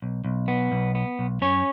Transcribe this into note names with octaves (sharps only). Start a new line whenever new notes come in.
B1
B1
B3
B1
B3
B1
F#2 C#4 C#5